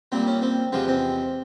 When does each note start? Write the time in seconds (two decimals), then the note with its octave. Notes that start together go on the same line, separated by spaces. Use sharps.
0.12 A#2 G3 C4
0.27 C#4
0.42 C4
0.72 E2 C3 F3 G#3 C4
0.88 C4